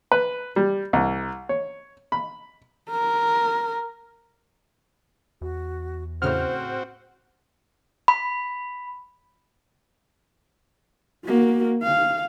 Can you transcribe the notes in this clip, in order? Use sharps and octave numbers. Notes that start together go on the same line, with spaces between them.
B4
G3
C2
C#5
B5
A#4
E2 F#4
A2 C#3 C4 F#4 C5 F6
B5
A#3 F#4
F5